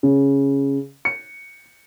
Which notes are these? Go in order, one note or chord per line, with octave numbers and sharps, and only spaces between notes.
C#3
C#7